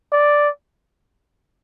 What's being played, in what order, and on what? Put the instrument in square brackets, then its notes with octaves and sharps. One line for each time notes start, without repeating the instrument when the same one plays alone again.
[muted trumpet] D5